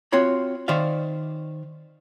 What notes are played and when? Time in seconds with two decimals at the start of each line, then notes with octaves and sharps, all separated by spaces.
0.12 C4 F4 F#4 C#5 B5
0.68 D#3 C5 D5 E5 F5